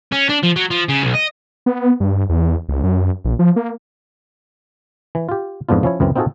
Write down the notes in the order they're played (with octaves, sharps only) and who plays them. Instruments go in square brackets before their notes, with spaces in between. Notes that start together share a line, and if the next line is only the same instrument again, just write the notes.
[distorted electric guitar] C#4
D4
F3
F#3
F3
C#3
B1
D#5
[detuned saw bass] B3
G2
E2
C#2
F#2
A#1
F3
A#3
[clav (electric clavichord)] E3
F4 G4
F2 G#2 B3 D4 F4
F3 C#4 E4 C#5
C#2 F#2 E3 C4
C4 D#4 F4 F#4 G#4 A4